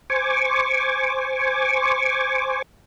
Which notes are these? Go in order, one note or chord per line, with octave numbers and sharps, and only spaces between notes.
C5 G#5 C#6 D6